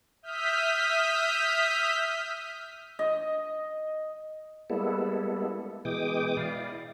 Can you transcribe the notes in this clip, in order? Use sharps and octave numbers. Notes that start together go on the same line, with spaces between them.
E5 D#6 F6 G6 B6
D#5
G3 G#3 A#3 B3 E4 A4
B2 E3 G#3 G5 D6 D#6
E4 D5 F5